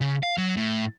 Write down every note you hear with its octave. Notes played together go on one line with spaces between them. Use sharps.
C#3
F5
F#3
A2